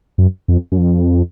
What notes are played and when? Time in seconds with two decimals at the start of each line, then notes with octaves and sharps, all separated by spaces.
0.18 F#2
0.48 F2
0.72 F#2
0.78 F2